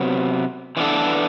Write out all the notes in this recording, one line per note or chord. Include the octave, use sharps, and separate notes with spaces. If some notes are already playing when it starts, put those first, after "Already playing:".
Already playing: C3 F#3 B3
E3 G3 B3 D4 A4